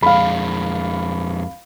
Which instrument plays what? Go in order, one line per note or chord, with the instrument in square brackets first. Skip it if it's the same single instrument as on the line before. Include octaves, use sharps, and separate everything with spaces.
[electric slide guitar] F2 G#3 [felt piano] F5 B5